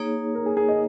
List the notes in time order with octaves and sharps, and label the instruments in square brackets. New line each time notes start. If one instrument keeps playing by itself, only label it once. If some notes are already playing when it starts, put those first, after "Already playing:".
Already playing: [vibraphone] A#3 D#4 G#4 C#5
[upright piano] A#4
G#4
G#4
D#5